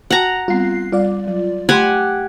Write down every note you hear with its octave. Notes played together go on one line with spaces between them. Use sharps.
F#4 F#5 G5 A5 A#5
G3 B3 C4 F4 C7
G3 F4 D5
F#3
A3 G4 F#5 G#5 B5 C6